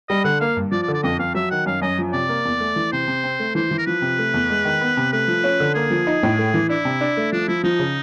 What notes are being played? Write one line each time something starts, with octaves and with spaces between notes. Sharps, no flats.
G3 D#5
D3 F#5
A#3 F5
G2
F3 D5
D5
D3
D5
F2 D#5
F2 F5
F#3 E5
D#3 F#5
F#2 F5
F#2 D#5
F3
C3 D5
A#3
E2
A3
E3
C3 C5
C3
C4
A3
E3 C5
E3
A#4
F3 B4
C3
A3
E2
G#3
D#3
B3
C3
A3 B4
F3
C#4
D3
A#3 G#4
F3
D#4
A2
A3
E3
D4 E4
C3
D4
A3
F3 D4
F3 E4
F3 D#4
C#3